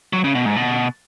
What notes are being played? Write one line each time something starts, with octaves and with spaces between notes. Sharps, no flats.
F#3
C#3
B2
G#2
B2